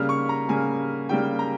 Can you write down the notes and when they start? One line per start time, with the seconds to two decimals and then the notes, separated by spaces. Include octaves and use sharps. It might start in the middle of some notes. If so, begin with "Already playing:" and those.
Already playing: C#3 G3 A#3 F6
0.09 C#6
0.29 A#5
0.49 C#3 G3 A#3 G#5
1.09 C#3 G3 A#3 G5
1.39 A#5